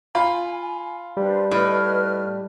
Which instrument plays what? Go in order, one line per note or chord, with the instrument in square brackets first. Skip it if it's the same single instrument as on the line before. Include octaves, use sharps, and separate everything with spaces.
[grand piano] F4 B5 [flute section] G#5
[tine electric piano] G3 [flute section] D4 B4 C5
[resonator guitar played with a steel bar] A2 [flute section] B4 D#5 F6